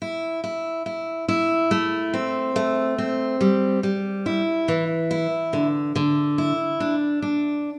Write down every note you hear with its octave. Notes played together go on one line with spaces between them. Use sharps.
E4
E4
E4
E4
A3
C4
A3
C4
G3
G3
E4
E3
E4
D3
D3
E4
D4
D4